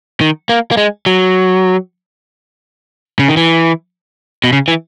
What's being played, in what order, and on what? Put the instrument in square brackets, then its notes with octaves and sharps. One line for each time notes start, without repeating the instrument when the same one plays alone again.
[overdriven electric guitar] D#3
A#3
A#3
G#3
F#3
C#3
D#3
E3
B2
C#3
E3